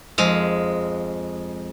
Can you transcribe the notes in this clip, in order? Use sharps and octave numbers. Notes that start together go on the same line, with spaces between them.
F2 G#3 F5